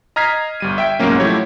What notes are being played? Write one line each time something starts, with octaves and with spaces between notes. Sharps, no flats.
D#5 A#5 F6 G#6 B6 C7
G1 G3 D#7
E5 G5 D7
C#2 G#2 B2 F#3 A#3 C#4
F3 F#3 A3 E4 G4 C#5